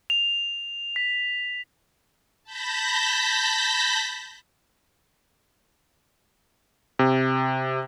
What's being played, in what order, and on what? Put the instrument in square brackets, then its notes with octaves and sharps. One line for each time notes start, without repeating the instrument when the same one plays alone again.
[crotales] F7
B6
[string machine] A5 B5 G6 A#6 B6
[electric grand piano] C3